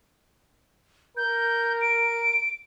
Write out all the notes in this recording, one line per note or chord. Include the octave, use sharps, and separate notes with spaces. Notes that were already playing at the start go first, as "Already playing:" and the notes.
A#4 G6
D7